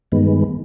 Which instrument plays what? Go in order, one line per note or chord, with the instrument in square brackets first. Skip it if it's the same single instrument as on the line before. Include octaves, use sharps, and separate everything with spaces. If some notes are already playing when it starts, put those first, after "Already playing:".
[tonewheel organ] G2 D#3 G#3 B3